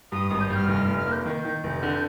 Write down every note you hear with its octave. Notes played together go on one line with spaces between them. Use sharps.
G2 D#6
G#1 D#6
G6
G2 F6
F1 F6
F6
F1
F6
A#3
G6
D#3
D#3
F1
D3